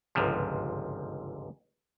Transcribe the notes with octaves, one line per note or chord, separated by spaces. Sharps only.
G1 C#2 G#2 C3 F3